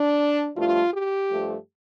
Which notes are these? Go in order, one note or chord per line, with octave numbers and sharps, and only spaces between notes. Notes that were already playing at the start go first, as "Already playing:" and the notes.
Already playing: D4
G2 F3 A3 F4
G4
G2 F3 A3